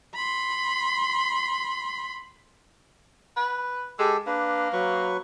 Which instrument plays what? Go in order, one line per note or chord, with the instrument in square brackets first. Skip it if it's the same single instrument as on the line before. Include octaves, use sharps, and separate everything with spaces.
[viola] B5 C6
[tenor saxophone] B4
[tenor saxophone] G#3 [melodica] G4 A4 E6
[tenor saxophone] A#3 [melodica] D4 B4
[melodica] F#3 B4 C#6